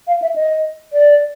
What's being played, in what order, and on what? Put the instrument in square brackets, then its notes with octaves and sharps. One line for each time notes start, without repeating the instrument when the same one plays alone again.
[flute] F5
E5
D#5
D5